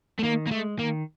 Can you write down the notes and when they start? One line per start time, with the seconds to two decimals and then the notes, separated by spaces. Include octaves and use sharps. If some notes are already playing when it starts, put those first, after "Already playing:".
0.19 A3
0.23 D#3 A#3
0.47 A#3
0.51 G#3 A3
0.79 D#3 A#3